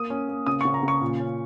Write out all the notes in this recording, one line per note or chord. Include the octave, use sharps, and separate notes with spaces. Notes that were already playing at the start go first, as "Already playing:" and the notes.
Already playing: A#3 D#6
C#4
A#3
C#3 D#6
C#6
C#3
A#5
C#3 C#6
A#2
C#4